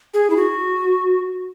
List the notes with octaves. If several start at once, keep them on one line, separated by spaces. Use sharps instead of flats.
G#4
E4
F#4